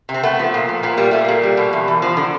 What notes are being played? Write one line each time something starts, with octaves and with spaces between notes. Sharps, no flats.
C3
C4
A3 B3
F3
A#2
A#2
A#2 B3
G3 A#3
G3 A3
A#2 A#3
G3
B2
E2
E2
F3
D3